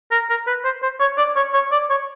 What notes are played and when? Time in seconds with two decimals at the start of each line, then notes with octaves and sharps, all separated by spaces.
0.11 A#4
0.30 A#4
0.47 B4
0.64 C5
0.83 C5
1.00 C#5
1.18 D5
1.36 C#5
1.54 C#5
1.72 D5
1.90 C#5